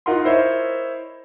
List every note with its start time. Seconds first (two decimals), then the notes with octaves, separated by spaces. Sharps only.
0.06 D#4 F4 A#4 F#5 C6
0.24 E4 A#4 C5 C#5 D#5 E5